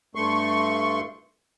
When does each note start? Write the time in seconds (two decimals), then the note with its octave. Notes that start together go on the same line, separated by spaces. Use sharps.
0.15 G2 A3 C6 C#6